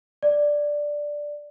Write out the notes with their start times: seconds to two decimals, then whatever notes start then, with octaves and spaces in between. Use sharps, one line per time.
0.23 D5